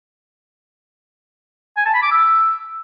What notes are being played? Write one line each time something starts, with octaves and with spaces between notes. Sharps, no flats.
G#5
A5
B5
D6
E6